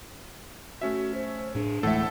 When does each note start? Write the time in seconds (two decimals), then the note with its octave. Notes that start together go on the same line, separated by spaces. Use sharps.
0.81 A3 C#4 F#4 E5
1.14 C5
1.55 A2 D4 G#4
1.83 D1 A2 E3 G#3 A4 E5 F#5